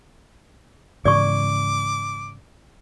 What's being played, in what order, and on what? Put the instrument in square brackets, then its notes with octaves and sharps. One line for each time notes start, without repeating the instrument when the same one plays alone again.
[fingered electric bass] G#2 C#3 E3 [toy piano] D5 C#6 [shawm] D6